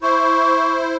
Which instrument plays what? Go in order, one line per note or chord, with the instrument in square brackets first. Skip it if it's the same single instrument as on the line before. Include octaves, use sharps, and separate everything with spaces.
[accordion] E4 C5 [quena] C#6